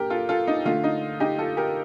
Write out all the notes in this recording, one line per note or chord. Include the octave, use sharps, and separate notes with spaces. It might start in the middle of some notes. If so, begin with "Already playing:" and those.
Already playing: A#2 G4 A#4
F4 A4
F4 A4
D#4
D3 A3 F4
D#4
D#4 G4
F4 A4
G4 A#4